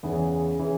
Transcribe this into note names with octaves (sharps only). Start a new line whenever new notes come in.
E2 C#3 E3 G#4
C#3 E3